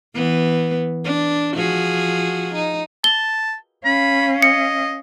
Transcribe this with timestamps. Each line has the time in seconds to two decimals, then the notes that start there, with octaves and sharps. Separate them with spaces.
0.15 E3 B3
1.04 D4
1.56 F3 F#4 G#4
2.55 D#4
3.04 A5 G7
3.85 C#4 F5 B5
4.42 D#5 C#7